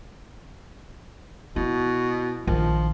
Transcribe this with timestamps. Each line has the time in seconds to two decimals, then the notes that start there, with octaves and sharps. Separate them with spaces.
1.56 B2 E4
2.47 A#1 D#3 F3